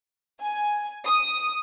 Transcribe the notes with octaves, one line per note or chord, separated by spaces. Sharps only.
G#5
D#6